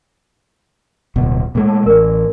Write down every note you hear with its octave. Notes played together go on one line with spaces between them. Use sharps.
D1 B2
A#2 G#3 A3
A5
A1 A#4 D5